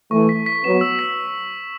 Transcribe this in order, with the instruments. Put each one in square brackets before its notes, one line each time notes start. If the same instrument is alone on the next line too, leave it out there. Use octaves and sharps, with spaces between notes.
[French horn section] E3 A3 [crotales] C#6
[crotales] B6
B6
[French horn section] F#3 B3 [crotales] E7
[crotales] E6
B6